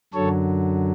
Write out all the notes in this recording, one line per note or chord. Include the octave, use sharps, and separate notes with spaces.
F#2 D3 F#3 A4 C#5